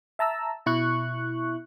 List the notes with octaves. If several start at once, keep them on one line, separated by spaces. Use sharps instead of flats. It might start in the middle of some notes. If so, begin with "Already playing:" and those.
E5 A5 A#5 E6
B2 E4 C#6 F#6